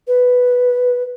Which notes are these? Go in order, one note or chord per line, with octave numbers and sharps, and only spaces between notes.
B4